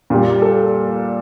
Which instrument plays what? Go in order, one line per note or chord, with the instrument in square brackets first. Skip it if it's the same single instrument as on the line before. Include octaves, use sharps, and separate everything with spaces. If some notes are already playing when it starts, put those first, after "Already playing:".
[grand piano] A#2 G3
A4